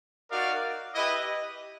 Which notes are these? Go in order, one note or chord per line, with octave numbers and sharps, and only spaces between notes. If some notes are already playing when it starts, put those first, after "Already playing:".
D#4 F#4 A#4 D5 F5
E4 G4 B4 D#5